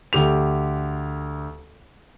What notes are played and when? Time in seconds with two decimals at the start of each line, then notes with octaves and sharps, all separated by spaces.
0.13 D2 G4 F7